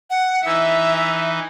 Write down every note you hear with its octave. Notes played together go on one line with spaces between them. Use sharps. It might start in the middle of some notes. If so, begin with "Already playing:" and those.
F#5
E3 D#4 E5 E6